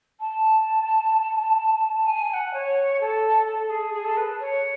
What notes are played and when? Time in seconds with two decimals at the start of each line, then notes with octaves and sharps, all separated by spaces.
0.20 A5
2.06 G#5
2.29 G#5
2.33 F#5
2.53 C#5
3.00 A4
3.47 A4
3.69 G#4
3.94 G#4
4.04 A4
4.17 B4
4.40 C#5